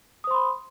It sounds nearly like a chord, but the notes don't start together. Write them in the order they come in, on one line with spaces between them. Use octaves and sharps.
D#6 C5 C6 B5